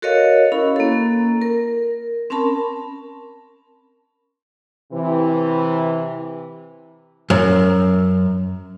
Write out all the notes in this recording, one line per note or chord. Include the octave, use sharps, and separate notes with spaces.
F#4 A4 A#4 C#5 D#5 F5
C#4 E4 B5
A#3 A4
A#4
C4 C#4 A#4 A5 B5
C3 E3
F#2